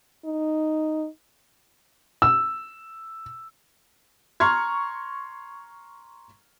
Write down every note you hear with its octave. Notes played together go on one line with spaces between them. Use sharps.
D#4
E6
A#5 C6 C#6 F6 G#6